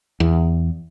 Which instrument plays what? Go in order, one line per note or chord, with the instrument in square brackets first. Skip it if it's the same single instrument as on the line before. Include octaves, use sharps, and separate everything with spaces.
[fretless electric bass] E2